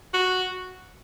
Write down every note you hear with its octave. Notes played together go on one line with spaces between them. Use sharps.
F#4